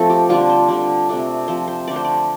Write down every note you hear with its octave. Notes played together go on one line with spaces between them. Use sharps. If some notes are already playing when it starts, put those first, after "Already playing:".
Already playing: F3 A3 C4 A4 C5
G4
D3 G3 D4 F4
C5
D3 G3 D4
C3 A3 D4
C3 F3 C4 C5
C5
D3 A3 D4 D5
C5
D5